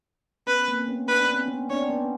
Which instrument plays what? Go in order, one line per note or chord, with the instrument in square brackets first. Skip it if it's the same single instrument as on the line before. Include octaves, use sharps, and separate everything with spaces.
[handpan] B3 C#4 [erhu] B4
[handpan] A#3 C4
C4
B3 C#4
[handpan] D4 [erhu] B4
[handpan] C#4
C4
B3 C#4
[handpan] C4 D4 [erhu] C#5
[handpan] B3 C#4